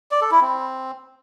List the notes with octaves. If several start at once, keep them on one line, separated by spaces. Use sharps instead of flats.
D5
A4
E4
C4